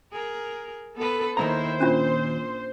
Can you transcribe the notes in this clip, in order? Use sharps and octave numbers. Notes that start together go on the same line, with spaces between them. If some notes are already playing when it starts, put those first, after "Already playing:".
G#4 A#4
B3 A4 B4
D#2 G#2 D#3 E4 C5 A#5
A#2 C#4 D4 F4